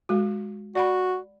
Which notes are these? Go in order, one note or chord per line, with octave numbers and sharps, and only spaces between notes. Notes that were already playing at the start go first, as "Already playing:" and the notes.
G#3 F#4
F#4 D5 F#5 B5